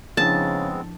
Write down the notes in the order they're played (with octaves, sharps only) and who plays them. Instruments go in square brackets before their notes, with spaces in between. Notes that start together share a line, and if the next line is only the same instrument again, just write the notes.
[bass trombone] C#3 [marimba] F3 D4 E4 [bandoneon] G#3 B3 C4 [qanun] A5